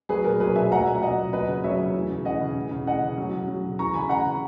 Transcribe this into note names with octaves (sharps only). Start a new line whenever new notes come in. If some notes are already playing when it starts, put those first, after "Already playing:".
F#3 G#4 B4
A#2 A#4
F#3 G#4 B4
A#2 E5 G#5
F#3 F#5 A#5
A#2 E5 G#5
F#3 D#5 F#5
A#2
F#3 B4 D#5
C#3
F#3 C#5 E5
C#3
E3
C#3
E3 D#5 F#5
C#3
E3
C#3
E3 D#5 F#5
C#3
F#3
C#3
F#3
C#3
E3 A#5 C#6
C#3 G#5 B5
E3 F#5 A#5
C#3